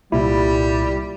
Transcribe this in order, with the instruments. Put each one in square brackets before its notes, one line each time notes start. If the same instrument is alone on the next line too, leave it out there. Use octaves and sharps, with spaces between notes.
[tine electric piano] C2 A#2 E4 [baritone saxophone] G3